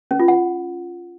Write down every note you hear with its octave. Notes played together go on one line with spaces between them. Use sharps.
C#4
F4
F#5